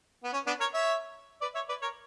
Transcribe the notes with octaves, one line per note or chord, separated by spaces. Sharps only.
B3
C#4
B3 D4
A#4 C#5
C#5 E5
B4 D5
C#5 E5
B4 D5
A#4 C#5